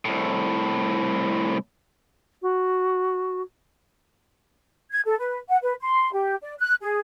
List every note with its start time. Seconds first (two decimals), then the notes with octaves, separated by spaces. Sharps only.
0.05 C2 A2
2.42 F#4
4.92 G#6
5.06 A4
5.19 B4
5.49 F#5
5.62 B4
5.81 C6
6.13 G4
6.42 D5
6.59 F#6
6.81 G#4